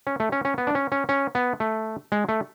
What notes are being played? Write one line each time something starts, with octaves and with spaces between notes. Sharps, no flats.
C#4
A3
C#4
C#4
B3
D4
C#4
C#4
C#4
B3
A3
G#3
A3